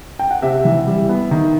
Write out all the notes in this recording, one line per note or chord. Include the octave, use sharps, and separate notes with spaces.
G5
F#5
C3 E5
E3
G3
B3
D#3